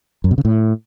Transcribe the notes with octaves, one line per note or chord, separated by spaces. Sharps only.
F#2
B2
C#3
A2